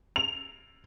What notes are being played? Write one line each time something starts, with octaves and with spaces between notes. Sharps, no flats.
F7